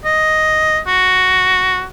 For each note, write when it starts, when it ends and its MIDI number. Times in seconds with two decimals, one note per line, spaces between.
0.05 0.79 75
0.87 1.85 66